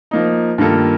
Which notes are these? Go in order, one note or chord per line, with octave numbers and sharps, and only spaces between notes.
F3 A#3 D#4
G2 D#3 A#3 F4 A4